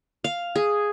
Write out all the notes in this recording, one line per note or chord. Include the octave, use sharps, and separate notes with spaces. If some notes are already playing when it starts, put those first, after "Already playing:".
F5
G#4